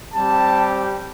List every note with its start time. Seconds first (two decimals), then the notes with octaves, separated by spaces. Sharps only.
0.14 G3 C4 G4 A5